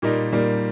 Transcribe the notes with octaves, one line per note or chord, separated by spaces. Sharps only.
A#2 G3 A#3 D#4
A#2 G3 A#3 D#4